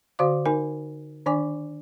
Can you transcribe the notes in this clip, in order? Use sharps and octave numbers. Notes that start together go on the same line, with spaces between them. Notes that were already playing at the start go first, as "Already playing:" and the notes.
D3 F#4 D5 F5 D6
D#4 A#4 G#5
D#3 D4 D5 G#5 D6